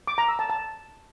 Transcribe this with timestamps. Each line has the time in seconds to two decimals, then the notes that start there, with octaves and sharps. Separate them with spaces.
0.07 D6
0.18 A#5
0.28 E6
0.39 A5
0.50 A5